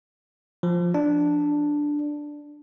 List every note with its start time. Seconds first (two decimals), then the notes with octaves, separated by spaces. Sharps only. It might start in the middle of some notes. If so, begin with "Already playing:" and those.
0.63 F3
0.94 D4